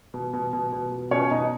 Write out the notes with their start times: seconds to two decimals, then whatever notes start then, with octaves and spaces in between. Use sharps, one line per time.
0.14 B2
0.33 B2
0.53 B2
0.72 B2
0.92 B2
1.11 B2 C#4 C#5
1.31 B2 D#4 D#5